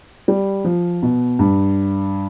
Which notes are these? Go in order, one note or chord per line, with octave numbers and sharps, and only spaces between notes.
G3
F3
B2
G2